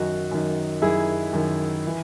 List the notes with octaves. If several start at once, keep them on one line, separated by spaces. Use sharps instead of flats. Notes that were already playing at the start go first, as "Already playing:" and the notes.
Already playing: F#2 D#3 D#4 F#4
F#2 D#3
F#2 D#3 E4 G#4
F#2 D#3
E3